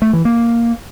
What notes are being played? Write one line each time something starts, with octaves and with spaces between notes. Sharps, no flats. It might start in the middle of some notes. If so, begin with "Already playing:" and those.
A3
E3
A#3